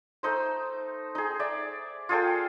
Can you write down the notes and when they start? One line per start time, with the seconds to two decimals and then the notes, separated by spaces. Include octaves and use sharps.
0.23 A3 D#4 C5
1.15 D#4 G#4
1.40 D5 E5
2.09 F4 G#4 A4 G5